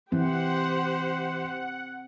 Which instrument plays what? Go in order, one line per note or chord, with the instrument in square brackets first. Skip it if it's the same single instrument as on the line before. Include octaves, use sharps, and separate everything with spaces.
[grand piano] E3 [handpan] C4 [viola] G4 C5 [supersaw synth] F#5